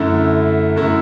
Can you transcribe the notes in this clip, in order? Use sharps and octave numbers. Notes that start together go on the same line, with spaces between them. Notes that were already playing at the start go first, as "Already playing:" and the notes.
Already playing: F#2 D3 A3 E4
F#2 D3 A3 E4